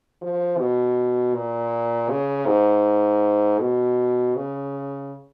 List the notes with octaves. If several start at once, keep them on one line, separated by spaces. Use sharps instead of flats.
F3
B2
A#2
C#3
G#2
B2
C#3